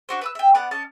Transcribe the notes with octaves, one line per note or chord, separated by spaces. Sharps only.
D4 F#4 C5
B4 D6 E6
E5 G5
B3 D5 F#5 D6
C#4 D#5 A5